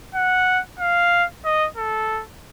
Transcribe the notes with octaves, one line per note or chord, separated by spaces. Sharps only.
F#5
F5
D#5
A4